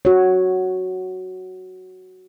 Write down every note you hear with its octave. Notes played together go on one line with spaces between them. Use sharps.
F#4 C#5